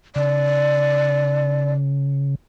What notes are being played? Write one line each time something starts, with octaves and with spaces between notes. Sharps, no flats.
C#3 D5